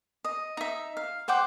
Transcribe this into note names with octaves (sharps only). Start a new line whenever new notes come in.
D#5
D#4 E5
F5
C5 F#5 G5 D6